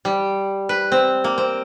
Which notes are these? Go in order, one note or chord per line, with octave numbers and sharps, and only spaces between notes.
G3
B4
C4
A#3
C4